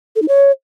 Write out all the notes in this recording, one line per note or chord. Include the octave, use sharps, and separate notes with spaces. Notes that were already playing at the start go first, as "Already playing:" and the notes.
A4
D#4
C#5